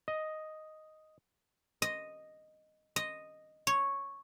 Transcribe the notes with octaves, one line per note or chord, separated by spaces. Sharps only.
D#5
D#5
D#5
C#5